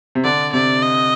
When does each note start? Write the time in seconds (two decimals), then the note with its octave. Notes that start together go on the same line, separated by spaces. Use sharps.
0.15 C3
0.24 D3 D5
0.53 C3 D5
0.82 D#5